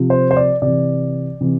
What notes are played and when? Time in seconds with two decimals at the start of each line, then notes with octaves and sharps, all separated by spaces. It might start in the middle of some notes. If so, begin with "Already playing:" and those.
Already playing: C3 F3
0.10 C5
0.31 C5
0.37 D5
0.62 C3 E3 D5
1.41 C3 E3